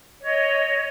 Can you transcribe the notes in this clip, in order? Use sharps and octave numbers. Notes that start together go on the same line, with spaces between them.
C#5 D#5